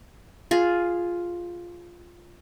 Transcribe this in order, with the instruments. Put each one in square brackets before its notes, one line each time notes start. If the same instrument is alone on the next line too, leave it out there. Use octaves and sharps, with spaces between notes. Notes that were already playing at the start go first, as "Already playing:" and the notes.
[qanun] F4 G#4